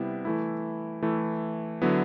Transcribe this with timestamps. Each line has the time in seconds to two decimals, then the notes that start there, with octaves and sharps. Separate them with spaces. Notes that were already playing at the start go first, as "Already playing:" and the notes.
Already playing: C3 G3 B3 E4
0.25 E3 A3 E4
1.03 E3 A3 E4
1.82 D3 F#3 B3 E4